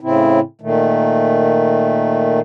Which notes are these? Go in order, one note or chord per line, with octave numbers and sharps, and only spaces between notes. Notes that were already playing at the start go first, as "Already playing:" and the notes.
A2 C#3 C4 E4
A#2 D#3 A3